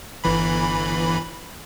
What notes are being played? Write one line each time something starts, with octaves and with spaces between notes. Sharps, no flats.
G1 E3 B5